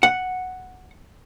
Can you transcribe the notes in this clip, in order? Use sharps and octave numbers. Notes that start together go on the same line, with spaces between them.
F#5